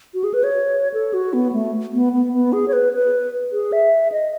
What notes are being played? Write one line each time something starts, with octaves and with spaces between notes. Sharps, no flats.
F#4
G#4
B4
C#5
A4
F#4
B3
A3
B3
B3
B3
G#4
C#5
B4
B4
G#4
E5
D#5